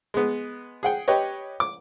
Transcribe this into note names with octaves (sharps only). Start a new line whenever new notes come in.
G#3 B3
G#4 F#5 G5
G4 B4 C#5 D#5
D6